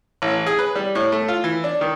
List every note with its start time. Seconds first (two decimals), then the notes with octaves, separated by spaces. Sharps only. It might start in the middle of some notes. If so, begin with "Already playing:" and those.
0.22 A1
0.46 G#4
0.59 B4
0.75 G3
0.95 A2
1.12 A3
1.28 F4
1.44 E3
1.64 D4
1.81 D#3